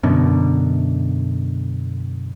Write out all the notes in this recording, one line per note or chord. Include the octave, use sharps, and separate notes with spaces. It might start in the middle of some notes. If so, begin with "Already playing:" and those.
F#2 B2 D3